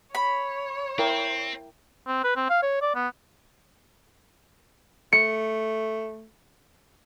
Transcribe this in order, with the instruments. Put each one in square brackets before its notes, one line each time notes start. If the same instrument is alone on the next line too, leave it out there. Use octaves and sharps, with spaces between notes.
[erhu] C#5 [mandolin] B5
[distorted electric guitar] C4 [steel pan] E4 A#4 G5
[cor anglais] C4
B4
C4
F5
C#5
D5
B3
[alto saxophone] A3 [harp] C#7